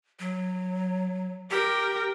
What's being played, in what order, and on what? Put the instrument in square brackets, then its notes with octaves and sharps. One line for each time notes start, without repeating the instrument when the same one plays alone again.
[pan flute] F#3
[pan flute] G4 [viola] A#4 G5